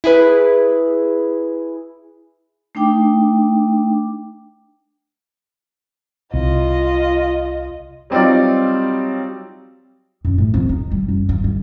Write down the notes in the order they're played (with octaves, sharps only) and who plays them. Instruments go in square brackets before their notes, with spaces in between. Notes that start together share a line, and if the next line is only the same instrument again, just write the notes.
[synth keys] E4 G#4 B4
[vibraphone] A3 D4 D#4 G5 D6
[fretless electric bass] C2 [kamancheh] F4 D#5
[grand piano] F#3 G3 C4 D#4 F4 D5
[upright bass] F#2
A2
F2
D#4
G3
F#2
G2
D3